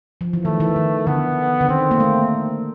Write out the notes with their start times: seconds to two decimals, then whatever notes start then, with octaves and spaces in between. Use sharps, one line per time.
0.21 F3
0.33 E3
0.45 D#3 A3
0.60 E3
0.76 D#3
1.07 D3 B3
1.61 D3
1.69 D#3 C4
1.91 A#3
2.00 A3